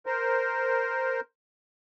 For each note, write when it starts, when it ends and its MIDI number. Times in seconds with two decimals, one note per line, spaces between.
0.06 1.20 70
0.06 1.20 72